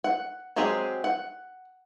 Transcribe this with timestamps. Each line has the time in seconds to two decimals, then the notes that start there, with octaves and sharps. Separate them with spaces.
0.04 F#5
0.56 F#3 G#3 C4 G4 G#4
1.04 F#5